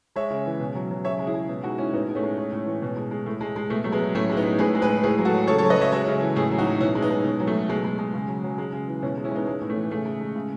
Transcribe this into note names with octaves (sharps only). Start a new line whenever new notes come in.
G#3 C#5 E5
C#3
E3
B2
F#3
F#3
C#3 C#5 E5
G#3
E4 G#4
G#3
B2
G#3 D#4 F#4
G#3 C#4 E4
A2 B3 D#4
G#3
A3 C#4
G#3
G#3
A2
E3
B2
G#3
G#3
A2 A3
G#3
G#3
B2 A3
F#3 A3
G#3 B3
F#3
A2 A3 C#4
G#3 E4
B3 D#4
G#3
A2 G#4 B4
G#3
G#4 B4
G#3
A2 G#4 B4
F#3
F#4 A4
F#3
C#3 A4 C#5
A4 C#5
F#3
B4 D#5
F#3 C#5 E5
G#3 C#5 E5
C#3
E3
A2 E4 G#4
F#3
D#4 F#4
F#3
B2 C#4 E4
G#3
B3 D#4
G#3
B2
F#3
A3
F#3
B2 G#3
G#3
G#3
C#3
F#3
F#3
G#3
C#3
E3
B2 C#4 E4
G#3
C#4 E4
G#3 B3 D#4
G#3 B3
A2
A3
E3
C#3 A3
G#3
G#3
C#3